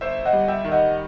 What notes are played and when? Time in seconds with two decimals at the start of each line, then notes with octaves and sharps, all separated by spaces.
0.01 G1 C5 E5
0.25 D#5 F#5
0.33 G3
0.48 E5 G5
0.64 D#3
0.72 D#5 F#5